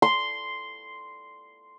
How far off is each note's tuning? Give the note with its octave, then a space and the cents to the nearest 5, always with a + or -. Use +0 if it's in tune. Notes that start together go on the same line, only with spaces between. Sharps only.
C6 -5